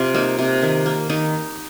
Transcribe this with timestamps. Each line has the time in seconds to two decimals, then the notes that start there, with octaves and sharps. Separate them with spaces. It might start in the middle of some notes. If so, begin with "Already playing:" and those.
Already playing: C3 F4
0.14 A#3 D#4
0.39 C3
0.62 D#3
0.86 A#3
1.10 D#3 D#4